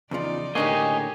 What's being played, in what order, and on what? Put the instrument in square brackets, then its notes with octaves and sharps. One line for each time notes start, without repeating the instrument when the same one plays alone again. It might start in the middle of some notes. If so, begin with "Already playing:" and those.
[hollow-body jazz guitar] E2 C#3 F3 [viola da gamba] D#4 D5
[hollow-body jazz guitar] A2 D3 A#3 [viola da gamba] D#4 G4 [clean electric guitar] G#4 C#5 D#5